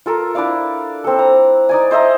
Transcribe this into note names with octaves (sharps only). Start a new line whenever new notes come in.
F4 A4 A#4
D4 E4 D5 F5
C4 A4
A#5
D#4 D5 G#5
C5 D#5 E5 A#5